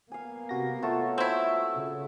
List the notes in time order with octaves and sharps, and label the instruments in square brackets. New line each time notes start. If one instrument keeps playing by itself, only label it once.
[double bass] A#3 B3 [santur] F5 G#5
[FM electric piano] C3 F#4 A#6
[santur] A3 F#4 C#5 [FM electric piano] F4 A5
[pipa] C4 E4
[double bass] C#3